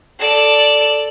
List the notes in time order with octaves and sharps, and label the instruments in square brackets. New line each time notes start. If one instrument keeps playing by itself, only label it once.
[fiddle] A4 D5